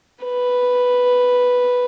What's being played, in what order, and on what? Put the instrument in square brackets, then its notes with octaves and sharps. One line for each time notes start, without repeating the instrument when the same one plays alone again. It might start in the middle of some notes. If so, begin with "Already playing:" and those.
[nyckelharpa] B4